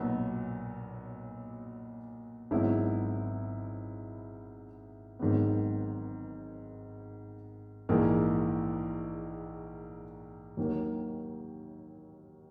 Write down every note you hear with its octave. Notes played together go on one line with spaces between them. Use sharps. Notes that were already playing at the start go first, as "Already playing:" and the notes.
Already playing: B1 A#2 F#3 B3
G#1 G#2 F#3 B3 E4
G#1 G#2 D#3 F#3 B3
A#1 G#2 E3 A#3
D#2 D#3 F#3 A#3